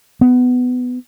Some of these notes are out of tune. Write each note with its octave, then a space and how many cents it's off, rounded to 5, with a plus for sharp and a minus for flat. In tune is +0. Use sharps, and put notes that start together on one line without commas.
B3 +15